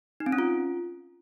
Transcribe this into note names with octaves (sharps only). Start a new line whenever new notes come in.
D#4
C4
C#4
F4